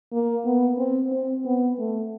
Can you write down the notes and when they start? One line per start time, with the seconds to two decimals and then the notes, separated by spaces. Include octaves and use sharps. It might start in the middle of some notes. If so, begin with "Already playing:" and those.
0.13 A#3
0.46 B3
0.79 C4
1.12 C4
1.45 B3
1.79 A3